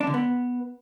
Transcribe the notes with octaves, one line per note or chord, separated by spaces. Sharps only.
D4
D3
B3